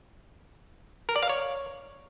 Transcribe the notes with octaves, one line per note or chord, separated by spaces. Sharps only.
A#4
D5
F5
C#5